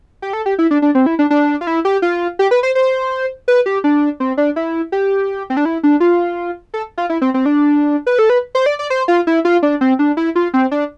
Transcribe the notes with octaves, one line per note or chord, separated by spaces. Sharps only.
G4
A4
G4
E4
D4
D4
C4
E4
D4
D4
F4
E4
G4
F4
G4
B4
C5
C5
B4
G4
D4
C4
D4
E4
G4
C4
D4
E4
D4
F4
A4
F4
E4
C4
C4
D4
B4
A4
B4
C5
D5
D5
C5
F4
E4
F4
D4
C4
D4
E4
F4
C4
D4